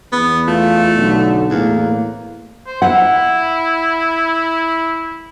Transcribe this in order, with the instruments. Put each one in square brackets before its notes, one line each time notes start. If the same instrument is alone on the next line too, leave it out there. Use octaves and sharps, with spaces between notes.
[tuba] E2 [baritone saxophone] B3
[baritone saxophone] A3 [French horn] F4
[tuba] B1 [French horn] D3
[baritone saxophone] E2 [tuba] A2 [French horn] A#3
[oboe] C5
[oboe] E4 [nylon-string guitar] F#5